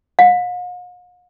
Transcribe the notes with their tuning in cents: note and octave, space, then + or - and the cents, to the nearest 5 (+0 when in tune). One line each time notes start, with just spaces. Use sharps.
F5 +45